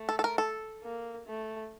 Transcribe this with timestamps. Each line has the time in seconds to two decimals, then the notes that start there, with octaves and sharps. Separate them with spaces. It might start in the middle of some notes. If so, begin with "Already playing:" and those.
Already playing: A3
0.09 A4
0.19 A4
0.24 A#4
0.38 A4
0.84 A#3
1.27 A3